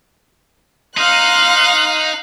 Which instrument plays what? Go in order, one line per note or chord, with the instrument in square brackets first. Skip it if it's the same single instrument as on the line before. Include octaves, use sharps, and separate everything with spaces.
[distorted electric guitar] D#4 [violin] F5 F#6 [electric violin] C6 F6